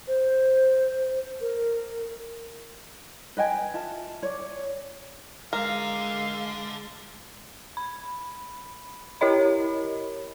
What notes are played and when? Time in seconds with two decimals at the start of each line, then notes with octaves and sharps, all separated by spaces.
0.08 C5
1.41 A#4
3.37 B4 D#5 G5 G#5
3.74 F4 E5 A5
4.23 C#5 D5
5.53 D3 G#3 A#4 F5
7.77 B5
9.21 E4 G4 A#4 C#5 D#5 B5